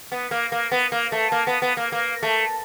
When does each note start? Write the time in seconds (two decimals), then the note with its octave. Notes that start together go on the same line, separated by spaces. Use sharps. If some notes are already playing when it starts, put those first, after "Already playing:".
0.12 B3
0.31 A#3
0.52 A#3
0.72 B3
0.92 A#3
1.12 A3
1.32 A#3
1.47 B3
1.62 B3
1.77 A#3
1.92 A#3
2.23 A3